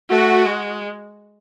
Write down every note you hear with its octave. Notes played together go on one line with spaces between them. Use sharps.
A3 F#4
G#3